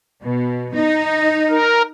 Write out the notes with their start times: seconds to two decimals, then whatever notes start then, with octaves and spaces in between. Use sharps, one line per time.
0.23 B2
0.74 D#4
1.50 A#4